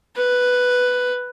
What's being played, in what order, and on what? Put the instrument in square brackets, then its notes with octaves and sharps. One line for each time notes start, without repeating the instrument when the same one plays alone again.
[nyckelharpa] B4